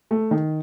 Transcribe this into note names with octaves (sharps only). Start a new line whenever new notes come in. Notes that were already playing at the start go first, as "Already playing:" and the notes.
A3
D#3